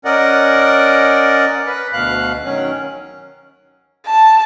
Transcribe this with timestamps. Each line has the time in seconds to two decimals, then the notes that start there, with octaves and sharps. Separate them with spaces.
0.05 C#4 A#4 D5 D#5 F#5
1.66 B4
1.93 D2 B2 F5 F#6
2.44 D#3 F#3 C#4
4.07 A5